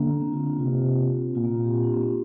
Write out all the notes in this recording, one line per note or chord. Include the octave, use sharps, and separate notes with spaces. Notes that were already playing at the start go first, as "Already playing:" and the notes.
Already playing: D3 A#3
C4
F4
D4
C3 F4
A#2 F4
A#3
C4
G4
F4
D4
C4
A#3